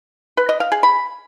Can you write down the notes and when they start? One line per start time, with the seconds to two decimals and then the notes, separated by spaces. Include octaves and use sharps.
0.37 B4
0.49 D#5
0.60 F5
0.72 G#4
0.83 B5